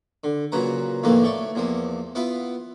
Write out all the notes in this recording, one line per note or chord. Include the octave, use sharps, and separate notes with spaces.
D3
A#2 C#3 F#3 B4 A#5
A#1 D#2 A2 E3 A#3 F5
A3 C#5 D5
E2 F3 A#3
B3 E4 F4 F5 B5